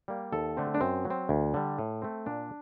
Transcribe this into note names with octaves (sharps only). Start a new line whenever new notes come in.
G3 A#3
D#2 A4
D3 A3 C4
D4
F#2 C4
F#3
C4
D2
D3 G3
A2
A3 C4
A#2 D4